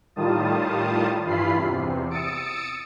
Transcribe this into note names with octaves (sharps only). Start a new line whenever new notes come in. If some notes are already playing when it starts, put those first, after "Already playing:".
A2 D#3 G3 F4 A5 D#6
G2 E3 E4 F4 B5 C7
E2 C3
D#6 E6 A6 C#7 D7